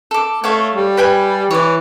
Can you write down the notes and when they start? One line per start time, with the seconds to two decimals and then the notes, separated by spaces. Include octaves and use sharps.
0.11 A4 D6
0.44 A3 C#5 F5 C#6
0.76 G3
0.97 B4 G5 G#5
1.51 E3 C#5 D5